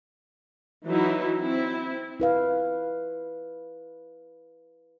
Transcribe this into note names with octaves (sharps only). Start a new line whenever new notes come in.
E3 F#3 D#4 E4
C4 E4
E4 B4 F5